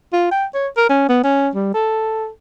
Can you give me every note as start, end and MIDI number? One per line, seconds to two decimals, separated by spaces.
0.13 0.30 65
0.31 0.45 79
0.54 0.68 73
0.77 0.87 70
0.89 1.06 61
1.09 1.20 59
1.23 1.48 61
1.55 1.72 55
1.74 2.28 69